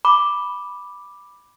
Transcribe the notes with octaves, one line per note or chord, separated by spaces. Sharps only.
B5 D6